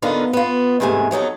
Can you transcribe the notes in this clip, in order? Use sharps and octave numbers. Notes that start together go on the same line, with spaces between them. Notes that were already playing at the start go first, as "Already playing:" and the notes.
D3 B3 D4 D#4 F4 A#4
B3 F4
E2 G#2 C3 A3 G#5
F2 F#3 D#4 A4